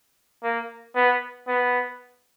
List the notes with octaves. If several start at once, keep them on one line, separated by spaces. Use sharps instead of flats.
A#3
B3
B3